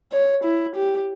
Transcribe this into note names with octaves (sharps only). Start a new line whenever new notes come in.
C#5
E4
G4